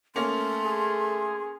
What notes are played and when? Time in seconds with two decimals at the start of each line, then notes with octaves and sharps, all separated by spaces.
0.16 A3 A#3 C#4 C6
0.66 G#4